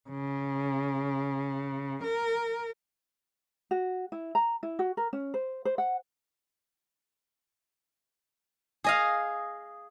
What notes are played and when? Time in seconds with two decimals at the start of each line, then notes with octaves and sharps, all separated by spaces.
0.10 C#3
2.04 A#4
3.71 F#4
4.12 E4
4.35 A#5
4.63 E4
4.79 F#4
4.97 A#4
5.13 C#4
5.34 C5
5.65 C5
5.78 F#5
8.84 G#4 D#5 F5